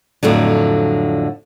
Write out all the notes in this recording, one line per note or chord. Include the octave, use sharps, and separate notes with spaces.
F2 A2 D3 F#3